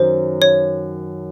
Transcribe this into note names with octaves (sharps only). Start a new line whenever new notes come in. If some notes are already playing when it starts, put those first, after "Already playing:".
Already playing: F#2 D#3 F#3 C5
C#5